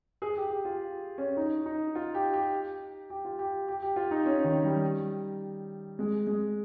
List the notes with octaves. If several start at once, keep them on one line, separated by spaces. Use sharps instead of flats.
G#4
G4
G4
F4
C#4
D#4
D#4
F4
G4
G4
G4
F4
G4
G4
G4
F4
D#4
C#4
D#3
G3
G#3
G#3